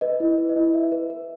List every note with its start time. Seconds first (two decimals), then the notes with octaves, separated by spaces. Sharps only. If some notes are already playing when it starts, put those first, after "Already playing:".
0.01 B4 D#5
0.20 E4
0.38 B4
0.49 D#5
0.56 E4
0.73 B4 E5
0.92 B4
1.10 B4